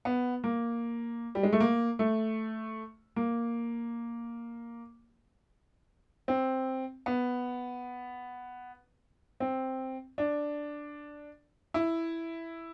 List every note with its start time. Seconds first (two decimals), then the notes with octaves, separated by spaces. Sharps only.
0.05 B3
0.44 A#3
1.35 G3
1.43 G#3
1.53 A3
1.60 A#3
1.99 A3
3.16 A#3
6.28 C4
7.06 B3
9.40 C4
10.18 D4
11.74 E4